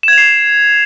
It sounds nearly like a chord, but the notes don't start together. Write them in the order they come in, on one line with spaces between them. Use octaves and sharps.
E7 G#6 F7 C7